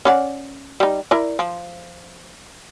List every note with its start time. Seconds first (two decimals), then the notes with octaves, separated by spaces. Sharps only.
0.05 C#4 D5 F#5
0.80 G3 D#4
1.11 E4 A#4 D5
1.39 F3